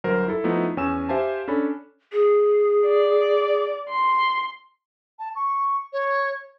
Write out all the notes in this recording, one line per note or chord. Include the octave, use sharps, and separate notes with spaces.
G1 F#3 A#4 C5
E4 A4
F3 A3 B3 D#4 E4
E2 C#4 G#5 E6 E7
G4 C5 E5 F5 G#5 A5
C#4 D4 A4 B5
G#4
D5
C6
A5
C#6
C#5